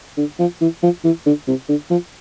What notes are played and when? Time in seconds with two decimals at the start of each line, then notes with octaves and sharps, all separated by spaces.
0.18 D3
0.39 F3
0.61 E3
0.83 F3
1.04 E3
1.26 D3
1.48 C3
1.69 D3
1.91 F3